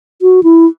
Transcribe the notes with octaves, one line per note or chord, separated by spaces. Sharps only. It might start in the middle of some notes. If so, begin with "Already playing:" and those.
F#4
E4